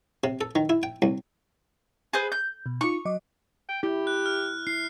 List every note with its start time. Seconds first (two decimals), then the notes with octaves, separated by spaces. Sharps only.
0.24 C3
0.41 A4
0.55 D#3
0.69 E4
0.83 G5
1.02 C2
2.13 G#4 B4 C5
2.32 G6
2.66 B2
2.81 D#4 F4 C#6
3.05 F#3 D#5 D6
3.69 G5
3.83 E4 G4
4.07 F#6
4.26 F6
4.67 E4 C7